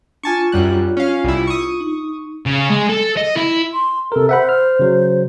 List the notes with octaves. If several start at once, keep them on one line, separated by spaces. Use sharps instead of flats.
D4 F4 G#5 A5 C#6
F#2 G3 F#6
C#4 F5
C2 E4
C#6 D#6
D#4
C#3
G#3
A4
D#5
E4
C6
C3 A4 A#4
C5 E5 F#5 B5
F6
C#3 F#3